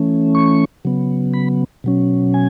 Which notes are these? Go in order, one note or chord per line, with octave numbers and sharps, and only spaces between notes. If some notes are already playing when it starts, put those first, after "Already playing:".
Already playing: E3 A3 C#4
C#6
C#3 F#3 B3
B5
B2 F#3 C#4
G#5